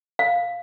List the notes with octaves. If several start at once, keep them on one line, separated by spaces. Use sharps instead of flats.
F5